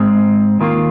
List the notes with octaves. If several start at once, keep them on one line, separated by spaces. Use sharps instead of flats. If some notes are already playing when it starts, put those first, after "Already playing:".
Already playing: G#2 G#3 C4
D#2 D#3 A#3 F4